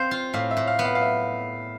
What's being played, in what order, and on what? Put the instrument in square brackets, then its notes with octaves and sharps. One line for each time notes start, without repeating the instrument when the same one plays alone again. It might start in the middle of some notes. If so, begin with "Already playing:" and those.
Already playing: [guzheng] C4 C5 [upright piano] F5
[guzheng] F4
[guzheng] A2 [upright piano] F5
[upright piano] E5
[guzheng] A2
[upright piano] F5
[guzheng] B3
[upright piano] F5
F5
E5